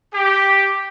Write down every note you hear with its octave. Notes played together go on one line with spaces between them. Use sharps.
G4